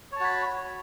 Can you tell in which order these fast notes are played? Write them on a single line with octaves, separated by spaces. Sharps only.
C#5 A5 F#4 B5